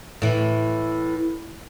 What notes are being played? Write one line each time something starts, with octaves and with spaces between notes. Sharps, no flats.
A2 E3